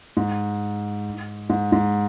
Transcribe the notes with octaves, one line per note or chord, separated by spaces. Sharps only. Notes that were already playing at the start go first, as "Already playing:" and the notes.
G#2
G#2
G#2